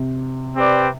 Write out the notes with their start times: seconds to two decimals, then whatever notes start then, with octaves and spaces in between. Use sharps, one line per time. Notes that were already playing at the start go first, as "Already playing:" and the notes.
Already playing: C3
0.55 C4 G4 B4 D5